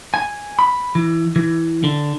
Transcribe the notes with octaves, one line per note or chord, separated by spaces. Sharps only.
G#5
B5
E3
E3
D3